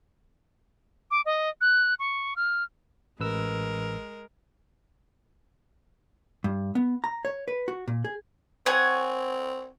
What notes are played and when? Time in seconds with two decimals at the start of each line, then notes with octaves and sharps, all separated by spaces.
1.11 D6
1.25 D#5
1.61 F#6
1.99 C#6
2.36 F6
3.20 A1 G#3 A#4 B4 E6
6.44 G2
6.75 B3
7.04 A#5
7.25 C#5
7.48 B4
7.68 F#4
7.88 A#2
8.05 G#4
8.66 C4 C#5 F#5 G#5